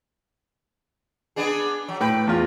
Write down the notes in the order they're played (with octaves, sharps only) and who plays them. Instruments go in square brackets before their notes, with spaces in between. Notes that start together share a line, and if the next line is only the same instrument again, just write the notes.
[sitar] B3 D4 G#4
F#3
[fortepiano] A2 G5 [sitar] B4
[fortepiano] E2 F4